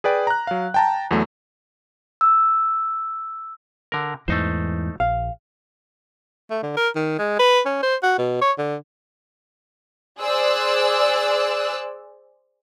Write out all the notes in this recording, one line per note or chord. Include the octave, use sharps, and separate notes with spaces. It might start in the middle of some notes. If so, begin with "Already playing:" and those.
G#4 B4 D5 G5
A#5 F#6
F#3 F5
G5 A5 A#5
E2 F#3 A3
E6
D3 A#4
E2 G#2 E3 A3 D#4 C5
A#1 F5
A3
D3
A#4
D#3
G#3
B4
C#4
C5
F#4
B2
C#5
D3
G#4 C5 D5 E6 F#6